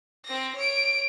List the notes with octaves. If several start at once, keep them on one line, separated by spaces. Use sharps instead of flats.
C4 A#6
C#5 D7